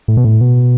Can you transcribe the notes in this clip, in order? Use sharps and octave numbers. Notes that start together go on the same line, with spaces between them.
A2
B2
A2
B2